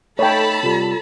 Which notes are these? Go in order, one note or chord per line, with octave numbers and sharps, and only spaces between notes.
A3 D#4 A4 C#5 G5 A5 B5
C3 G3 F4